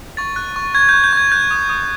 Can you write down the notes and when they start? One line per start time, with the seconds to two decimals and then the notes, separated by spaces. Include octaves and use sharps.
0.17 C#6 A6
0.36 F#6
0.56 C#6
0.75 C#6 G#6
0.89 C#6 G6
1.04 G6
1.13 C#6 G#6
1.32 F#6 G6
1.51 D#6
1.69 D#6